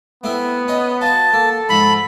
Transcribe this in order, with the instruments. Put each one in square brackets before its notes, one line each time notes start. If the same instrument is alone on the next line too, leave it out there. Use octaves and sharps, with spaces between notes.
[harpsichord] A3 C4 E4 [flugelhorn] B3
[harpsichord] C#4 D#5
[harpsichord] F4 F#4 [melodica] A5
[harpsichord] A#3 [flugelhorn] A4
[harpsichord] G#2 F3 [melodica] B5